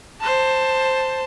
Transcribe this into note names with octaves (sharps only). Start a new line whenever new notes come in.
C5 A5